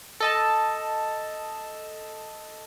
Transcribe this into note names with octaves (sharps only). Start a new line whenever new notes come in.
A4 D#5 A5